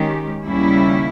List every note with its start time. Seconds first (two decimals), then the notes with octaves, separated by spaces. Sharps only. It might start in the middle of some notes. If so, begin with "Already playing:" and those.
Already playing: D#3 G#3 C#4 G4
0.46 D#2 C#3 G3 C#4 E4